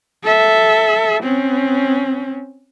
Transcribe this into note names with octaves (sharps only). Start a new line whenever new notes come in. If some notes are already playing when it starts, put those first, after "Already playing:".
A4 E5
C4 C#4